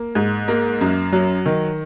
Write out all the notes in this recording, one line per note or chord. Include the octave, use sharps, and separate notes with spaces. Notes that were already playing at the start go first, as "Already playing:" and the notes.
Already playing: A#3
G#2
A#3
F#2
F#3
D#3